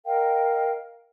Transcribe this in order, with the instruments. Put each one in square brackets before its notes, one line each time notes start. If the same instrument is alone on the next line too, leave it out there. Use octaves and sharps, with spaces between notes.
[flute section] A#4 D#5 F5 G5